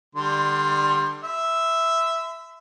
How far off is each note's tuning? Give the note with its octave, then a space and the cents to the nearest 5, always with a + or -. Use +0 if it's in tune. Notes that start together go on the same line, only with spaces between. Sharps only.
D3 +25 G3 +15 C6 +20
E5 +0 B5 +45